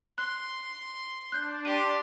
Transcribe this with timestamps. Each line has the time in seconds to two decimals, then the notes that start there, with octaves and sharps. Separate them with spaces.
0.18 C6 F#6
1.32 D4 F#6 G6 C7
1.65 G4 C6 D#7